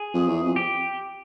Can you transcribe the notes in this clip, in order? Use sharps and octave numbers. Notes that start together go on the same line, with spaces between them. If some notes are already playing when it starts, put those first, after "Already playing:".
Already playing: G#4
F2
E2
F2
G4